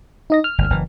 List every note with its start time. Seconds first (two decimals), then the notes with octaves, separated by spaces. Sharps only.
0.30 D#4 D#5 A#6
0.44 F6
0.58 G1 D2
0.70 F#1 E3